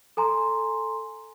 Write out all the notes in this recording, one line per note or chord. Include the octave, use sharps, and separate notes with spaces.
A4 G#5 A#5 C6